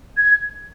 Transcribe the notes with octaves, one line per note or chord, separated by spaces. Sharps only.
G#6